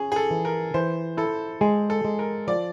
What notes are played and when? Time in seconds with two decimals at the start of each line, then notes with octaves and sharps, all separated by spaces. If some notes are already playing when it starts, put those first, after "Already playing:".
Already playing: C#4 G#4
0.12 G#4
0.16 A4
0.30 E3
0.45 A#4
0.74 E3 C5
1.17 E4 A4
1.61 G#3 G#4
1.90 A4
2.05 G#3
2.19 A#4
2.47 F3 D5